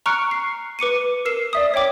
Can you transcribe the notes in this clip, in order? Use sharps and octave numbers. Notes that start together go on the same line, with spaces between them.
A#5 C#6 F6 F#6 C#7 D7
C7
B4 D6 C#7 D#7
A#4 E6 C7 E7
D5 E5 D#6
C#5 E5 G5 D6 B6